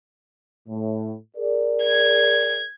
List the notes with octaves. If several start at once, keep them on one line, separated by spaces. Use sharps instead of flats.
A2
G#4 A#4 D5
G#6